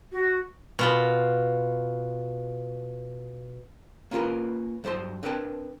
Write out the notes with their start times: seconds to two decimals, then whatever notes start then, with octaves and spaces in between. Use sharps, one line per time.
0.12 F#4
0.79 B2 F4 B5
4.11 A#3 C#4 F4 G#4 A#4 B4
4.84 G2 F#3 C5 A5 C6
5.23 C4 D4 A#4 B4 G5 A5